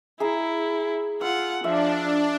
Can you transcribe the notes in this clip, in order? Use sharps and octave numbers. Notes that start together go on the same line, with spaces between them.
E4 G#4 G#5 A#5
F4 F#5 E6
F3 D4 E5